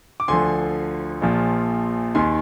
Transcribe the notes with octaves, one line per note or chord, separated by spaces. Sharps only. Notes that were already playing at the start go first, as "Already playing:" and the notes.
D6
D2 D3 F3 G#5 C6
A#1 A#2 F3
D#2 D#3 G#5 C6